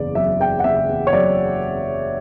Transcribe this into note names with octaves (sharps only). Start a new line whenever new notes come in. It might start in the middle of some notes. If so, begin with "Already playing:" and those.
Already playing: F#1 E2 D5
F#3 E5
E2 G5
F#5
F#1 E5
E2
C#5
F#3 D5